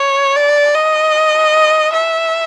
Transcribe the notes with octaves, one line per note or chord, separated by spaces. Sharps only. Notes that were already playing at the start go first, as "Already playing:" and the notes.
Already playing: C#5
D5
D#5
E5